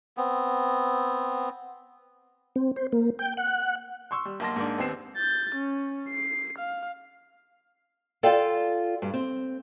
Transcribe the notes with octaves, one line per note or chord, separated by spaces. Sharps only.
B3 C4
C4
C5
A#3
G5
F#5
C6 C#6 E6
G3
B1 A#3 A5 C6 A#6
G#2 A#3 D4
D#2 B3 C4 C7 E7
G6 A6
C#4
C7
F5
F4 A4 D5 F5 G5
G2
C4